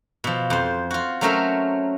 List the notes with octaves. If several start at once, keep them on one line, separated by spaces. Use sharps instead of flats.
B2 F3
F2 C5
F4 F#4
F#3 A3 C#4 A#4 C5 E5